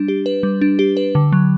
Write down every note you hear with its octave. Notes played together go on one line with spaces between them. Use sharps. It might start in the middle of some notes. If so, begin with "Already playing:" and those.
Already playing: G3 D4
G4
B4
G3
D4
G4
B4
D3
F#3